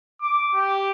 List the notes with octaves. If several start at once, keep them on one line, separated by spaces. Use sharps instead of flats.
D6
G4